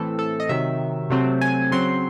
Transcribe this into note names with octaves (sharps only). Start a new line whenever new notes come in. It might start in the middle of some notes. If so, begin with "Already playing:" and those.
Already playing: A2 E3 A3 C4 A4
A4
D#5
C3 D#3 F#3 E5
C3 F#3 A3 C4
G#5
C#3 F#3 C4 C6